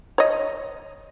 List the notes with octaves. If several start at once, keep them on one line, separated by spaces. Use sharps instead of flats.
C#5 D#5